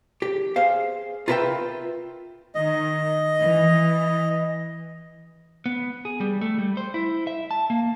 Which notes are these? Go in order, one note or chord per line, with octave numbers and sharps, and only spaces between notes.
G4
G#4 C5 F5
F4 A#4 B4 D5 E5 G5
D#3 D#5
E3
B3
G#4
G3
A3
G3
C5
E4
E5
A5
A#3